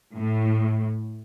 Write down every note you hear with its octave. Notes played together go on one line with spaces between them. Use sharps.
A2